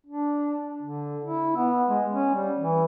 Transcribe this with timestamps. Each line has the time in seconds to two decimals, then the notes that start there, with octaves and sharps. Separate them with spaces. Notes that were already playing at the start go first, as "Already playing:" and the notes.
0.07 D4
0.82 D3
1.25 E4
1.57 B3
1.89 G#3
2.11 C#4
2.35 G3
2.60 E3